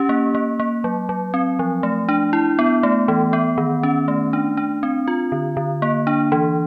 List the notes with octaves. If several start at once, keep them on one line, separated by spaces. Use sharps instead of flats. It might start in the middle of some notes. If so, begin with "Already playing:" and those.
Already playing: C#4 G4
A#3
A#3
A#3
F#3
F#3
C4
F3
A3
D4
E4
B3
A3
E3
B3
D#3
C#4
A3
D4
D4
C4
F4
D3
D3
A#3
D4
E3